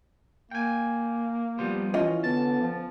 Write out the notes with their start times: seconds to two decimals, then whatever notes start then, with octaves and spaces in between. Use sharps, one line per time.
0.51 A#3 G5 G#5
1.59 F3 G3 B3 C5
1.94 E3 C#4 F4 D#5
2.24 D3 B3 A5
2.60 F3